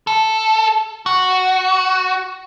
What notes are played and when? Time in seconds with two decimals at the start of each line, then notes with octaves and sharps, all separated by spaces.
0.07 A4
1.06 F#4